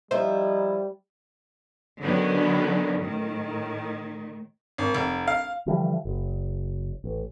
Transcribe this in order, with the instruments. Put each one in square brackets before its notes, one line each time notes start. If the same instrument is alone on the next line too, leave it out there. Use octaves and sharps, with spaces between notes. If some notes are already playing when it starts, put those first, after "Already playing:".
[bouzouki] F3 E4 [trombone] G3 [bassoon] D#4 [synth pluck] C5
[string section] D3 D#3 F#3 B3 C#4
A2 D#3
[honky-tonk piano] G#1
F1
F5
[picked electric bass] D3 E3 F3 G3
F#1
A1